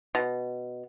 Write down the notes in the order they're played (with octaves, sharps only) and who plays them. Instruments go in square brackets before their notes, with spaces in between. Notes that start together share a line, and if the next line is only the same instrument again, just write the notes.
[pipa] B2